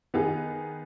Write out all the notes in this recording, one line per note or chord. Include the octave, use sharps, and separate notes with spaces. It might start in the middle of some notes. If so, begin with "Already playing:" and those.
D#3 B3 D#4 G#4